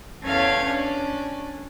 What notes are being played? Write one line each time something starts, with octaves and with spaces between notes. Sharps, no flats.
E2 C#4 A4 C#5 F5 G#6
C#4 D4